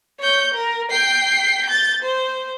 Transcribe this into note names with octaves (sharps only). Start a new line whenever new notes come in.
C#5 G6
A#4
G5 C7
G6 A6
C5